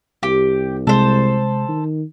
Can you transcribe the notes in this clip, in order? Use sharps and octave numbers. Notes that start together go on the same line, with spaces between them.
C2 G4
C3 G#3 A4 C5
D#3